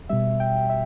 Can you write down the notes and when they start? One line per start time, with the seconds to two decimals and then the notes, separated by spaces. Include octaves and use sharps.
0.09 B2 G3 E5
0.40 G5
0.69 E5